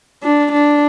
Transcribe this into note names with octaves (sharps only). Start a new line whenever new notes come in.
D4
D4